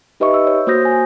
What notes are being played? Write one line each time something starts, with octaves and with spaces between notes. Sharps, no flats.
D#4 G4 B4 D#5 E5 C#6
E6
C#5
A#3 F#4 C5 D#6 G6 A#6
G#5